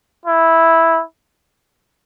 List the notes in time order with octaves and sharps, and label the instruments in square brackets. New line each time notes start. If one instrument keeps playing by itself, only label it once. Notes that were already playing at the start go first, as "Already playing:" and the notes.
[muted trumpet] E4